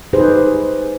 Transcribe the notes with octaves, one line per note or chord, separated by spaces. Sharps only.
D#4 G4 G#4 B4 C5